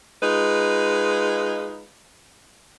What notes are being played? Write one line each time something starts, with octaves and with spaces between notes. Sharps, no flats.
G#3 D#4 F4 B4